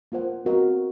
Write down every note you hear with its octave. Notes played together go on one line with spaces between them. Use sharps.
A#3 F4 C5 F#5
C4 F#4 A#4 D#5 F#5